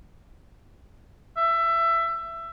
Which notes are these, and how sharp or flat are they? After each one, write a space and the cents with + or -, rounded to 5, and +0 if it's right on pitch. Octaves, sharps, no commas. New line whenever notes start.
E5 +20